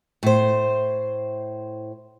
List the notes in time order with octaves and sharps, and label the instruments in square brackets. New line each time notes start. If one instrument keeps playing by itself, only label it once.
[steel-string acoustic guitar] A2 C5